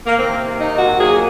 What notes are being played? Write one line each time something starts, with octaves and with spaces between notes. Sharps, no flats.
A#3
C3 D#3 A#3 C4
D#4
F#4
A#2 F#3 A#3 G#4